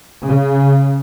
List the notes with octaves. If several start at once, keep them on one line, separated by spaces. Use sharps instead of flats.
C#3